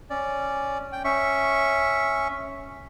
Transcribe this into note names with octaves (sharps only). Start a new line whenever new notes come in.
C#4 D5
G5
C#4 E5 C#6